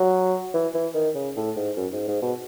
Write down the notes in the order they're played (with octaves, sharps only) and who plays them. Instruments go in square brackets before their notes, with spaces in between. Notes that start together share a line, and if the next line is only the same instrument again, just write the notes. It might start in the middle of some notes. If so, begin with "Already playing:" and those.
Already playing: [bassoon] F#3
E3
E3
D#3
C#3
A2
G#2
F#2
G#2
G#2
B2